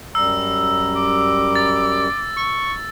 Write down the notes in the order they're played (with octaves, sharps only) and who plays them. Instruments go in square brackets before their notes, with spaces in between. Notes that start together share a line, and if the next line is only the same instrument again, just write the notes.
[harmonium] F#2 G3 A#5 [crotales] E6
[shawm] D6
[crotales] A6
[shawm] C#6